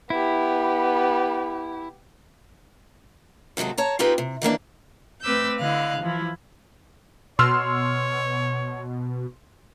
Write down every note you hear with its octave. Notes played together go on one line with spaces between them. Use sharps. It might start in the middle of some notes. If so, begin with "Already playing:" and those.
B3 E4 G4
D#2 C3 F#3 G#3 A4
C#5 A5 A#5
C4 D#4 F4 G4 G#4 B4
C3
D#3 E3 A#3 D4
A3 C4 B4 D6 E6 G6
D3 E4 D#5 F5 F#6
E3 F3 E4
B2 C#5 C6 E6 F6